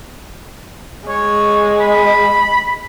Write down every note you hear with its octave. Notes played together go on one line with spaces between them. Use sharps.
G#3 C#5
B5